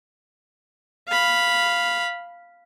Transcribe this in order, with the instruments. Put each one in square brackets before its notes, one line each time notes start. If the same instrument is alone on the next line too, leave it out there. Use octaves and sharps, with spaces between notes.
[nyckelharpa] F5 B5